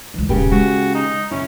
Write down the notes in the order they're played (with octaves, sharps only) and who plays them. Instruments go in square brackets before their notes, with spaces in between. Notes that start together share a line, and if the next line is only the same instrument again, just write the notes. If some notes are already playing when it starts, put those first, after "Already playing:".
[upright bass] C#2 E3
[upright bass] D#1 G2 [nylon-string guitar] C#3 G4 B4
[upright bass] G#3 [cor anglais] F#4
[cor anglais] D#4
[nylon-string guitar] C#3 E4 [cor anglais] C#4